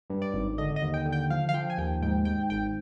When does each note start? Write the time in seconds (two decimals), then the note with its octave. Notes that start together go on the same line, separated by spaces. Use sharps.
0.10 G2
0.22 D5
0.33 G#1
0.58 D3 D#5
0.76 D#5
0.82 D#2
0.94 G5
1.06 D3
1.12 G5
1.30 F3 F5
1.49 F5
1.54 F3 G5
1.70 G#5
1.78 D#2 G5
2.02 G#2 G5
2.25 G#2 G5
2.50 G#1 G5